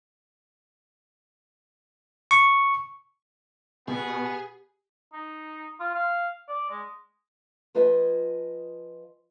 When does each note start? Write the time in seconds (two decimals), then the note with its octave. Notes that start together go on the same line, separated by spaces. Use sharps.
2.31 C#6
3.88 B2 B3 G4 G#4
5.13 D#4
5.80 F4
5.95 F5
6.48 D5
6.70 G#3
7.75 F3 F4 B4 C5 D#5 G#5